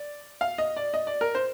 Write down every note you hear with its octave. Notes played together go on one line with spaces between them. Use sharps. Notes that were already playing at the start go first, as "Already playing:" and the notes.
Already playing: D5
F5
D#5
D5
D#5
D5
A#4
C5